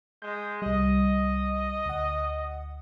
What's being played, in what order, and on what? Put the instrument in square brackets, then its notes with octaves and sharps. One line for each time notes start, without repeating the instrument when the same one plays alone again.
[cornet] G#3 [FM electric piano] G6
[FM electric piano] C2 G3 [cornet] D#5
[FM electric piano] D2 F#5